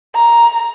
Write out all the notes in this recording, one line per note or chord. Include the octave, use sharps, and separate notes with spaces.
A#5